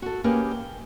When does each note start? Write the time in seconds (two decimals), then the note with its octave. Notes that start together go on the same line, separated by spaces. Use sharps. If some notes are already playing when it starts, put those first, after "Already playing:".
0.02 F#4 A4
0.24 A#3 C#4 G4 G#4 A#4 B4
0.51 G5